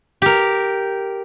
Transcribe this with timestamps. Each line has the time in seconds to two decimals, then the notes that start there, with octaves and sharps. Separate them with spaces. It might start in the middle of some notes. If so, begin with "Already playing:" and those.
0.22 G4 A#4